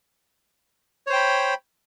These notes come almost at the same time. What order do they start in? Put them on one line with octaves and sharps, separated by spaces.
C#5 C5 G5 B5